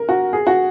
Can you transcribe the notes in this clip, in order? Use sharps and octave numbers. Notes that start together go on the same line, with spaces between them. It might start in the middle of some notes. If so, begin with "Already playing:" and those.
Already playing: A#4
F#4
G#4
F#4